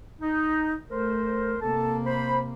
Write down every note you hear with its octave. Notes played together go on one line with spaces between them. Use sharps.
D#4
A3 A#4 C5
C3 A#3 A4 A5
C5 B5